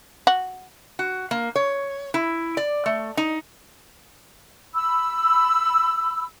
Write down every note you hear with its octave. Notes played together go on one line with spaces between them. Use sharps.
F#4
F#4
A#3
C#5
E4
D5
A3
D#4
B5 E6